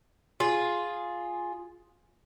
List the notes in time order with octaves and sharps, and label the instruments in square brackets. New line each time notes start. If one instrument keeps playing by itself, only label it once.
[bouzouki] F4 G#4